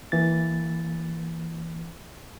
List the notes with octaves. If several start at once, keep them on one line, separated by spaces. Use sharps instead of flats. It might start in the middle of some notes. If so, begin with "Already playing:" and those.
E3 A#3 A6